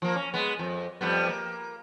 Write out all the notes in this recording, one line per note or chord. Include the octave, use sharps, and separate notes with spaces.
F3 A#3
C#4
G#3 B3
F2
F2 G3 B3
A#3